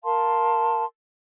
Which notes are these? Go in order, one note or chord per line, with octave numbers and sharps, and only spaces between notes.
A#4 F5 A5 C6